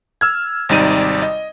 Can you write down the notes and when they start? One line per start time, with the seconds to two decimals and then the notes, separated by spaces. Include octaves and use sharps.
0.21 E6 F6 G#6
0.69 G#1 C3 G3 D#4 D5 D#7
1.22 D#5